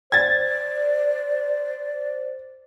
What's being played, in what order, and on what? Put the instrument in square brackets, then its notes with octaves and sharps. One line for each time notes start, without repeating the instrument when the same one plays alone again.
[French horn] C5 [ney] D5 [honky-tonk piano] G#6 A6